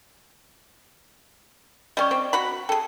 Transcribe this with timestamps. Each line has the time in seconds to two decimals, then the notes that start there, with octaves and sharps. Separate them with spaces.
1.97 G3 C#4 G4 D#5 G5 C#6
2.11 C4
2.33 F#4 F#5 B5
2.69 G#4 A4 G5